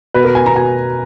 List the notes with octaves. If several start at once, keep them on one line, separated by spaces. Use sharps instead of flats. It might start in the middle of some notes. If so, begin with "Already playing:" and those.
B2 B4
A#4
G#5
A#5
B2 G#5